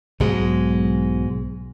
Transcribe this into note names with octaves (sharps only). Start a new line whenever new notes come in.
B1 G#2 F#3 G#3